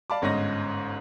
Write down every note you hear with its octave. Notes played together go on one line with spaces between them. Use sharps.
D5 F5 A5 B5 D6
G1 G#2 C#4 C#5 D#5 A#6